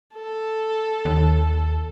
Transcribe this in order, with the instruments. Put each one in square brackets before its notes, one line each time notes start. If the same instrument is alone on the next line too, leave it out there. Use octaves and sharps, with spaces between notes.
[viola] A4
[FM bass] D#2